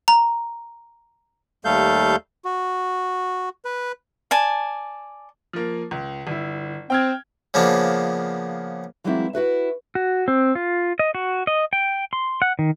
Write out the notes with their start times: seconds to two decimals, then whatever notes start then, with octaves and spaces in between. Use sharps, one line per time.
0.08 A#5
1.65 D#2 G3 A3 A4 F5 G6
2.45 F#4
3.65 B4
4.31 D5 G#5 A5
5.53 F3 A#3
5.91 C#2
6.27 G1 E4
6.90 C4 G5 F6 G#6
7.54 C#3 F3 A#3 B3 D4
9.04 E3 F#3 G#3 A#3 C4 E4
9.33 E4 F#4 B4 E5
9.95 F#4
10.28 C4
10.55 F4
10.99 D#5
11.15 F#4
11.47 D#5
11.73 G5
12.13 C6
12.42 F#5
12.59 D#3